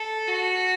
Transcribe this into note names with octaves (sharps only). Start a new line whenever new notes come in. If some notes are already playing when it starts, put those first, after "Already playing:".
Already playing: A4
F#4